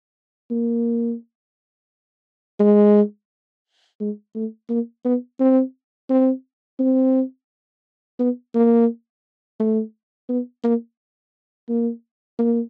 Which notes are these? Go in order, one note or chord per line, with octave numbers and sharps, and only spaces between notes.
A#3
G#3
G#3
A3
A#3
B3
C4
C4
C4
B3
A#3
A3
B3
A#3
A#3
A#3